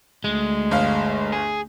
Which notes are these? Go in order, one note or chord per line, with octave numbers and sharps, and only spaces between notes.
D2 G#3
G1 F5
G#4